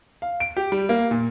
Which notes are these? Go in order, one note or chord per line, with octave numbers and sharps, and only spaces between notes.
F5
D7
G4
G3
A#3
A#2